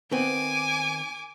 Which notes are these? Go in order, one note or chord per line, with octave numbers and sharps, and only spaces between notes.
D#3 B3 C4 G#5 D6